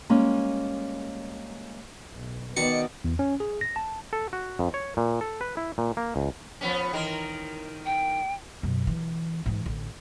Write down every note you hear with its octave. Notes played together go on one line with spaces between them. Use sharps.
G3 G#3 A#3 C#4
B1
B2 D#3 B3 D5 C#7
E2
C#4
G#4
A#6
A5
A4
F#4
F2
C#5
A#2
A4
B4
E4
A#2
A#3
C#2
F3 B3 C#4
D#3 E3 A#4
G5
F#2 B2
E3
G#2 E3
A1 D3